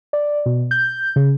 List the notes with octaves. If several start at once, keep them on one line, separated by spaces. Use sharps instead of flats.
D5
B2
G6
C#3